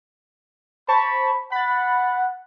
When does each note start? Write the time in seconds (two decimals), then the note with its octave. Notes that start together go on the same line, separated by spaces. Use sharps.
0.88 C5 A5 B5 C#6
1.52 F#5 B5 A6